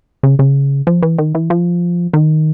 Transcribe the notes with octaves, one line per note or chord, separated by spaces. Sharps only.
C#3
C#3
F3
E3
D#3
E3
F3
D#3